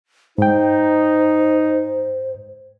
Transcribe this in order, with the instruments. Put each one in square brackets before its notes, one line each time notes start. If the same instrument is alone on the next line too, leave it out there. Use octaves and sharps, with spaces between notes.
[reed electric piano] G#2 G5 [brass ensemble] D#4 [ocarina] C5